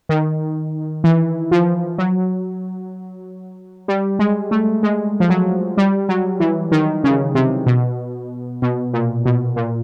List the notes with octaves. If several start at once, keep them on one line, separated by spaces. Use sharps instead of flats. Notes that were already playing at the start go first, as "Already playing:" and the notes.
D#3
E3
F3
F#3
G3
G#3
A3
G#3
F3
F#3
G3
F#3
E3
D#3
C#3
C3
B2
B2
A#2
B2
A#2